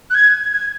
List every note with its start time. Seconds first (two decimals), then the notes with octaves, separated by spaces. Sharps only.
0.10 F#6
0.15 G#6
0.52 G#6